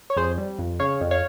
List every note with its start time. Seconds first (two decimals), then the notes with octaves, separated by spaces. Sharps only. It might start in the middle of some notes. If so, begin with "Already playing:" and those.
0.10 C#5
0.16 F2 G#4 C5
0.38 G3
0.59 F2
0.80 C#3 C#5 F5
1.01 F2
1.11 C#5 F5